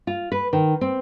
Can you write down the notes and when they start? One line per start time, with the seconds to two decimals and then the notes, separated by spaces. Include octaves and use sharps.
0.07 F4
0.32 B4
0.53 D#3
0.81 C4